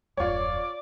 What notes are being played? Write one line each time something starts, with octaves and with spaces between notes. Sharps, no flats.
D#1 F#2 F4 C#5 D5 D6